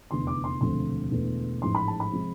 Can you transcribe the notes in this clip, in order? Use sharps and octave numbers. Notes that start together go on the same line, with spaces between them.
F1 E2 D3 C6
D6
C6
E1 D2 C3 F3 A3 C6
E1 E2 D3 A3
A1 G#2 F3 G#3 C6
B5
A5
B5
C3 F3 G#3